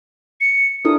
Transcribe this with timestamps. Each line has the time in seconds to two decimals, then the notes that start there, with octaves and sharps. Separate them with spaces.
0.41 C#7
0.85 D4 E4 A4 D#6